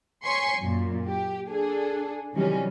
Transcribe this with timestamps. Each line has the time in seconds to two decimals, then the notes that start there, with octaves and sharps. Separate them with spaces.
0.24 C#5 G#5 C6 C#6 B6 C#7
0.59 F#2 A#2
1.06 G4
1.50 D4 G#4 A4
2.33 C3 D#3 E3 F#3 G3 C#4